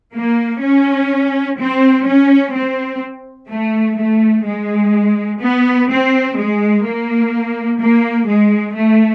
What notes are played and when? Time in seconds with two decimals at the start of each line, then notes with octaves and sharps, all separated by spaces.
0.16 A#3
0.64 C#4
1.60 C4
2.07 C#4
2.55 C4
3.50 A3
3.98 A3
4.46 G#3
5.41 B3
5.89 C4
6.37 G#3
6.85 A#3
7.80 A#3
8.28 G#3
8.76 A3